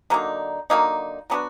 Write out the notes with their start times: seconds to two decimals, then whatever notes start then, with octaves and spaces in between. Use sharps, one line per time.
0.10 D3 F#3 A#3 D#4
0.70 D3 F#3 A#3 D#4
1.30 F#3 B3 D4 F#4